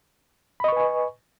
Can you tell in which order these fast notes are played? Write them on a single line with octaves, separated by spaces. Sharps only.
B5 D#5 C#6 B4 G#5